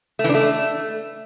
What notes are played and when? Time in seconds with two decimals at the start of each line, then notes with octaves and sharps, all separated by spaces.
0.19 A3
0.24 E3
0.29 D4
0.35 A3